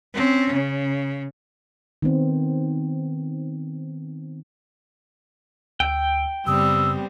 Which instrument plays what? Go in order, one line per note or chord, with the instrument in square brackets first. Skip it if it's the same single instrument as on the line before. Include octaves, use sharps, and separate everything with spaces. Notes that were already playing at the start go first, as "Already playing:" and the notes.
[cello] C4 C#4
C#3
[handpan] D#3 B3 C4
[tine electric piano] D2 E6 [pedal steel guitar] G5
[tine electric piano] F#2 C#3 D#6 [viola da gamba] G3 B3 C4 [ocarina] E6